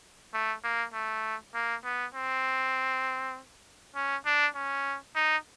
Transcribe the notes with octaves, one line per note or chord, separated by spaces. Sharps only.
A3
A#3
A3
A#3
B3
C4
C#4
D4
C#4
D#4